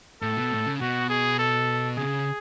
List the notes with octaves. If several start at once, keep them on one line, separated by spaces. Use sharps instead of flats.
A2 A4
B2
A2
C#3
B2 F#4
G#4
A4
C#3 G#4